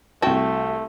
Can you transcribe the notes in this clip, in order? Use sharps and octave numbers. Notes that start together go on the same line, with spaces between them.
C2 A3 F#4 G5 A5